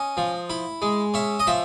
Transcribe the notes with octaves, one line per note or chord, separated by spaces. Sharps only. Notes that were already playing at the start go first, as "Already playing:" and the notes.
Already playing: C#4 D#5
F3
E4
G#3
C#4 E5
D#5
F3 E5